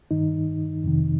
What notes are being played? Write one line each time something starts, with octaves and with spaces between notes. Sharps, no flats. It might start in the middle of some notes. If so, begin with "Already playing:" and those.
G2 D#3 D#4
F2 C3 D#3